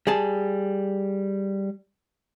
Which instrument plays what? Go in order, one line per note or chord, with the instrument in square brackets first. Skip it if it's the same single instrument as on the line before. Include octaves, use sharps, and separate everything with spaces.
[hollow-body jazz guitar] G3 G#4 A5